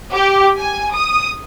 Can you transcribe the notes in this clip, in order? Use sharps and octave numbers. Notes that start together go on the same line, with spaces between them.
G4
G#5
D#6